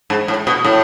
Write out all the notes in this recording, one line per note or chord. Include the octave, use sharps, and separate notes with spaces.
G#2
A2
B2
A2